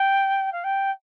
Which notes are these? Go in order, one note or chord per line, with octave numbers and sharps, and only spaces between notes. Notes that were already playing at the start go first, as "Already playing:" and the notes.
Already playing: G5
F5
G5